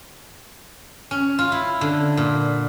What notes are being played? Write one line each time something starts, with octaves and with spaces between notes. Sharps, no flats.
C#4
F4
E4
D3
A#2